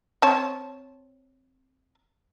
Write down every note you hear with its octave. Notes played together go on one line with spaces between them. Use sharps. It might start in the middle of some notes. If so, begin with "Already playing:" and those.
C4 C#5 A5